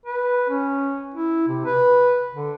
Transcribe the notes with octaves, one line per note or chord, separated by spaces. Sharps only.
B4
C#4
E4
C3
B4
D3